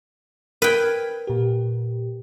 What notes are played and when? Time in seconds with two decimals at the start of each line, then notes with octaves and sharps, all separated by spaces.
0.62 A#4 B4 G5 F6 G#6
1.27 A#2 G4